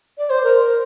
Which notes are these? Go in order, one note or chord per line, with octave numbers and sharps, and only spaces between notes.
D5
C5
A#4